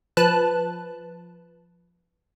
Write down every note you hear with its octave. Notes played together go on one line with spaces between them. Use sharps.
F3 B4 A5 F#6